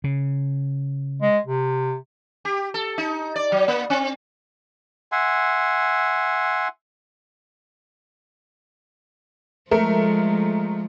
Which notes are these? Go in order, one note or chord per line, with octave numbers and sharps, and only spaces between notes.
C#3
G#3
C3
G4
A4
D#4
D5
F#3
A#3
C4
E5 F#5 G#5 C6
F3 G#3 A3 A#4